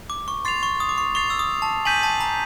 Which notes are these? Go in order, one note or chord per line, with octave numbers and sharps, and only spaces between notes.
D6
C#6
C6 A6 C7 F7
C#6
D#6
D6
C#6
C#6 A6 C7 F7
E6
D#6
A5
G#5 G6 B6 D#7 F#7
A5
A#5